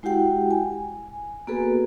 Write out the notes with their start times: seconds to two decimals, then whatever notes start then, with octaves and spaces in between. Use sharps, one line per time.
0.03 G#3 E4 F#4 G4 F#5 G5
0.51 G#5
1.47 A#3 B3 F#4 G#4 A4 B4